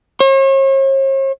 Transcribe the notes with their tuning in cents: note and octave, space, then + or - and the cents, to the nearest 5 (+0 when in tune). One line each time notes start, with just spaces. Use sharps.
C#5 -45